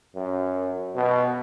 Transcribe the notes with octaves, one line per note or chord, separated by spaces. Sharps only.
F#2
B2